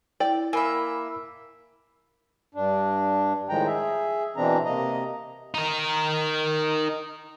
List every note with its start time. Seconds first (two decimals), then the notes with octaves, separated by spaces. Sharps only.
0.20 E4 D5 G5
0.53 A#3 E5 G#5 B5 E6
2.55 G2 D4
3.49 A2 D#3 F3 G#3 G5 A#5
3.67 G#4 E5
4.36 B2 E3 C4 D4 A#5
4.65 C3 A#3 D#5 A#5
5.54 D#4 A#4